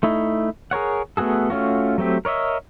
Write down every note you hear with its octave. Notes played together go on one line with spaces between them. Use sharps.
A3 D#4 E4
G#4 A#4 C#5 F#5
A3 B3 F#4 G#4 A4
A3 C#4 F4 F#4
F#3 A3 C4 G4
A#4 C#5 D#5 E5